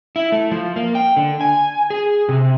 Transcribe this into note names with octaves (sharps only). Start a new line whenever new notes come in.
E4
A3
F3
A#3
G5
D3
G#5
G#4
C3